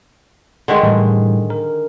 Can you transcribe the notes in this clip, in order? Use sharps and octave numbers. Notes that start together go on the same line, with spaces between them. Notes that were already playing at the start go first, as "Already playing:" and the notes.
D3 D#3 G#3
A2 E3 G3
A#4